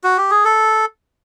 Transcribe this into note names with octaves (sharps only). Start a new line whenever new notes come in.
F#4
G4
G#4
A4